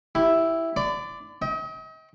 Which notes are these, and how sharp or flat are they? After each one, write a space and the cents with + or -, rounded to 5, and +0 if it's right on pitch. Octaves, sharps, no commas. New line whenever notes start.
E4 +0 G4 +0
D5 +0 B5 +45 D6 +0
D#5 +40 G5 +0